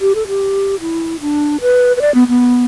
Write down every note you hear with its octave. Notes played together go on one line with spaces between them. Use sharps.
G4
A4
G4
E4
D4
B4
B4
D5
B3
B3